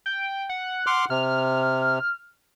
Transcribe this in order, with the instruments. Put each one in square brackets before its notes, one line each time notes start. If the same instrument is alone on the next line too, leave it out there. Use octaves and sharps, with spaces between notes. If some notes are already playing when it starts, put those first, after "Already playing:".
[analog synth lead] G5
F#5
[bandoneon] C6 D6 F6
[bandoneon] C3 [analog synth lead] F6